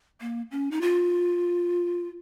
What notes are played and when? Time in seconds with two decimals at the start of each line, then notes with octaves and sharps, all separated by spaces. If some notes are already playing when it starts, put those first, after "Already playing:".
0.21 A#3
0.51 C#4
0.71 D#4
0.81 F4